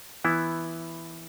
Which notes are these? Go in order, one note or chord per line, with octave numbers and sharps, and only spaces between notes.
E3 B3 E4